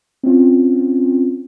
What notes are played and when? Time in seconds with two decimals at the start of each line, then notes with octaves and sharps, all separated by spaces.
0.23 C4 C#4 F4